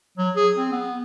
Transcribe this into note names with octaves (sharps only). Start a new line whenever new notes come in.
F#3
G#4
C4
B3